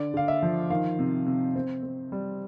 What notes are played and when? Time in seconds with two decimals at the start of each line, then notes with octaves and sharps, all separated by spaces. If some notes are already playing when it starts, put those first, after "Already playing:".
Already playing: D3 D5
0.14 D3 F5
0.28 E5
0.43 F3
0.70 D#3 F5
0.99 C3
1.26 C3
1.55 C4
1.83 C4
2.12 G3